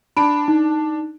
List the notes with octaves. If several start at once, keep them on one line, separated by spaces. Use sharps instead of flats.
D4 B5 D7
D#4